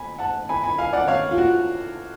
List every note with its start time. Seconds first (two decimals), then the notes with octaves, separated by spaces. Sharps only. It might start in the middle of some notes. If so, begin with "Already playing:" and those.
Already playing: G#5 B5
0.18 F#5 A5
0.49 G#5 B5
0.63 G#5 B5
0.78 F5 G#5
0.93 D5 F#5
1.08 C#5 F5
1.31 F4
1.38 F#4